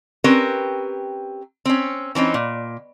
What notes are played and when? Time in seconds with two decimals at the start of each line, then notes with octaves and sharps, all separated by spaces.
0.24 C4 C#4 G4 A#4 B4
1.65 C4 C#4
2.15 E3 C4 C#4 D#4
2.34 A#2